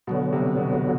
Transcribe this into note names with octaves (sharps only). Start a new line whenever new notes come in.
B2 D3 F#3 B3
C3
B2
B2